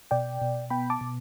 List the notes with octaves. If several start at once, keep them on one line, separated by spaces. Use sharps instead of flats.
B2 D5 G5
B2
B3 G5 B5
A5 D6
B2